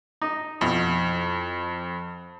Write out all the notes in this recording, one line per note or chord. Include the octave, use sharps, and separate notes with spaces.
D#4 D#5
F2 B2 E4